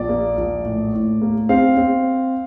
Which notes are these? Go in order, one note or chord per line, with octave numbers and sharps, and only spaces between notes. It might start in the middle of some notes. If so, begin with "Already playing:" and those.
Already playing: A#1 D5
A#3
A#1
A2
A2
A#3
C4 F5
C4